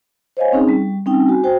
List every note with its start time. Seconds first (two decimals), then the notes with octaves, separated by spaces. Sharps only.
0.37 C5 C#5 D#5 F5 G#5
0.53 C4 C#4 D#4 G#4
0.69 G3
1.06 G3 C4 C#4 D#4 G5
1.29 F#4 G#5
1.44 F#4 C5 G5